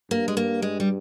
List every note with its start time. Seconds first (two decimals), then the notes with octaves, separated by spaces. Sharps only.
0.11 G2 A#3
0.28 G#3
0.37 A#3
0.62 G#3
0.80 G3